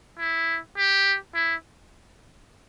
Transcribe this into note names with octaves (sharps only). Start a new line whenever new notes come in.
E4
G4
E4